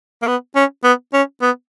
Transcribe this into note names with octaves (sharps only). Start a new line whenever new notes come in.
A#3
B3
C#4
B3
C#4
B3